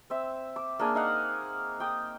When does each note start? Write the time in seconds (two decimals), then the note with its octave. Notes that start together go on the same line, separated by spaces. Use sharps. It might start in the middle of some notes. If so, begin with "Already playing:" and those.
0.10 C4 E5
0.56 D6
0.79 A#3 D4 G#4
0.95 D#4 F5 F#5
1.80 G5 D#6